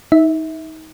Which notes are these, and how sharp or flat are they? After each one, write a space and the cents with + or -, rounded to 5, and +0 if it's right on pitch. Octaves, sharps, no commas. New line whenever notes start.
D#4 +25 E5 -20